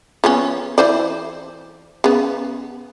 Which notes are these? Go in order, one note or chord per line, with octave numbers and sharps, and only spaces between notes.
F3 B3 C#4
E3 C5 D5
C#3 B3